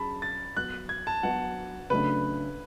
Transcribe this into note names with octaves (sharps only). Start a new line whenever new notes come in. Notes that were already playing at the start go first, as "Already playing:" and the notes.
Already playing: F#3 C#4 G#4 A5 B5
A6
F#3 B3 F#4 F#6
G#6
A5
F#3 B3 F#4 F#5
C#3 F#3 A3 D4 B4